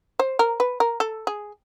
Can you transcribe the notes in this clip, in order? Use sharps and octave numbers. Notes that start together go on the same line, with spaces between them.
C5
A#4
B4
A#4
A4
G#4